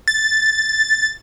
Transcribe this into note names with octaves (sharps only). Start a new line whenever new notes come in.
A6